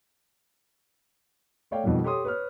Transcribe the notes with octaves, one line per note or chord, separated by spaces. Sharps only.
A3 C#5 D5 F5 G5
F2 B2 D#3 F3 G3
G4 A4 C#5 C6 D#6
B4 C#5 F6